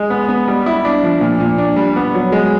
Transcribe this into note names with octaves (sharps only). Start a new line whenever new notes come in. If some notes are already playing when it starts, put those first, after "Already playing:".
Already playing: G#3
B3
B3
G3
E4
D4
F3
A#2
A#2
D4
G3
B3
F#3
G#3